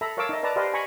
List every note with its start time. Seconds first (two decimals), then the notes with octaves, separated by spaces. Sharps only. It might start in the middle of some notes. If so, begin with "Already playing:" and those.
0.01 A4 E5 A#5 B5
0.17 A#4 C#5 F5 A5 D6 E6
0.29 D#4 D#5 E5
0.43 B4 D5 A5 A#5
0.56 G4 B4 C5 D5 D#5 F5
0.73 G#5 A#5 B5 C#6